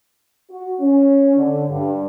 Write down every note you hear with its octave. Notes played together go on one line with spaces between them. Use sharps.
F#4
C#4
D3
G2